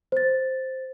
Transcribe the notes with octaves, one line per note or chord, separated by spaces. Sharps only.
C5 A6